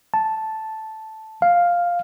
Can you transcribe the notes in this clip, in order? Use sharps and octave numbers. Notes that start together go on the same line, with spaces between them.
A5
F5